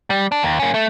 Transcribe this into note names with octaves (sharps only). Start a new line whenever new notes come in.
G3
D4
D#2
A#3 C#4
A3